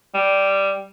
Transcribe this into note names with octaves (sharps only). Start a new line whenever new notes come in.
G3